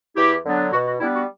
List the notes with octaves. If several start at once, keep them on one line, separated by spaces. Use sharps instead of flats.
E2 E4 G4
D3 F#3 B3 D4
B2 F#4
F#4
G3 B3 D4 E4
F#4